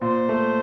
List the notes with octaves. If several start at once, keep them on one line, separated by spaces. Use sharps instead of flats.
A#2 C5
A3